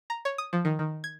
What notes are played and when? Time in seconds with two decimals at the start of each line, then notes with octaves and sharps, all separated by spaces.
0.10 A#5
0.25 C#5
0.38 D#6
0.53 F3
0.65 D#3
0.79 D#3
1.04 G#6